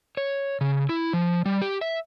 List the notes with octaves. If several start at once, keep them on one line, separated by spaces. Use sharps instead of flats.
C#5
C#3
E4
F3
G3
G4
E5